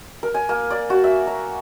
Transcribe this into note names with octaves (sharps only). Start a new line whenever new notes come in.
A#4
G#5
A#3
D5
F#4
E5
A#5